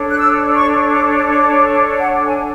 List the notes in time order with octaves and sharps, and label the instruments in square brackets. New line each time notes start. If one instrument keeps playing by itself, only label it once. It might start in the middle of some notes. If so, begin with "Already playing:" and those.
Already playing: [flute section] D4 A4 C#5
F#6
E6
C#6
D6
D6
F#5
G#5